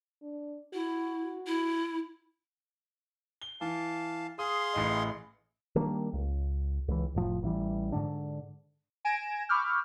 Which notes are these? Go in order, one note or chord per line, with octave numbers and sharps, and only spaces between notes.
D4
E4 F#4
E4
G7
E3 F5 A5
G#4 F5 C6 D#6
A1 A2 D#5
D#3 G3 A#3 D4
C#2
C#2 E3
F1 A2 F3
A1 E3 G3
G#2 D3 D4
G#5 G#6 A#6 D7 E7
B5 C#6 D6 E6 F6 G6